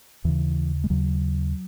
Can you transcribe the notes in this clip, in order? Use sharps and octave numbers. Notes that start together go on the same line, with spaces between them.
D#2 C#3 E3
G#3
D#2 C#3 F#3